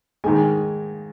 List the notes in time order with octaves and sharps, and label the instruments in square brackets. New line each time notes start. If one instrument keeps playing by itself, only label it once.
[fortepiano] G#2 D#3 G#3 G#5